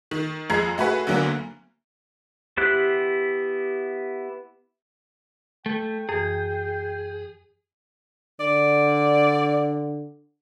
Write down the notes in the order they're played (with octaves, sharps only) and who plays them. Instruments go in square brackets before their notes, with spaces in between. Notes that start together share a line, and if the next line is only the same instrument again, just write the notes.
[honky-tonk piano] D#3
F2 G#3 A#5 G#6 C7
A3 F#4 G#4 B4 F#5
D2 D3 F#3 A#3 B3
[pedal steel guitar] B3 E4 G4 C5 F#6
[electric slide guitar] A3 [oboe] G5
[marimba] F#2 E3 [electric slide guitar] G#4
[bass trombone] D3 [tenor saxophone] D5